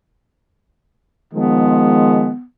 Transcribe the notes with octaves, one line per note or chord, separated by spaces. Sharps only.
D#3 F3 G#3 B3